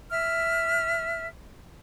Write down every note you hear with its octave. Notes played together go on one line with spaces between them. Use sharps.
E5 F6